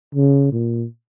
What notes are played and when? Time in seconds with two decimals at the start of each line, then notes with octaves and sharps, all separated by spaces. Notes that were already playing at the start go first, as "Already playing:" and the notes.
0.15 C#3
0.52 A#2